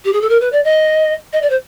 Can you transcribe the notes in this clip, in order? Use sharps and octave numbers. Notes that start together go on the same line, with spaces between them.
G4
G#4
A4
A#4
B4
D5
D#5
D#5
D5
C5